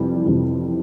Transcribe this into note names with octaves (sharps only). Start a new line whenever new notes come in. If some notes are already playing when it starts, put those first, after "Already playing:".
Already playing: F2 C3 E3 G3 C4
F2 C3 E3 G3 C4